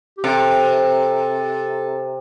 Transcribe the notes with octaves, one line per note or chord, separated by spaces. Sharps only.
G4
C3 A4